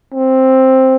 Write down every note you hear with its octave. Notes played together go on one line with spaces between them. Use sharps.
C4